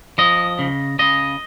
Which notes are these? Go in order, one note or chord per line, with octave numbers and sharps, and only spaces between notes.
F3 D#5
C#3
C#3 D#5